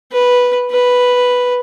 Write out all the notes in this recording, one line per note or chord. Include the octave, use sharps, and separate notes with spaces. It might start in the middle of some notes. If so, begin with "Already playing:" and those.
B4
B4